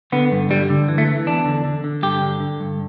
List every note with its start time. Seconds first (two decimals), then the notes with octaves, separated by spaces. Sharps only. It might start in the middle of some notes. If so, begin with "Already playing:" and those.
0.12 D3 B3
0.32 G2
0.50 D3 G3
0.70 D3
0.88 E3
0.98 A3
1.08 E3
1.27 E2 D4
1.45 D3
1.65 D3
1.84 D3
2.03 G2 G4
2.22 D3
2.40 D3
2.60 G2